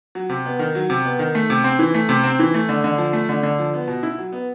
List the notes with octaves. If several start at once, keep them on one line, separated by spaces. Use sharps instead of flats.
F#3
C3
B3
D#3
F#3
C3
B3
D#3
A3
C3
C4
E3
A3
C3
C4
E3
A3
D3
D3
F3
A3
D3
D3
F3
B3
B2
E4
F#3
B3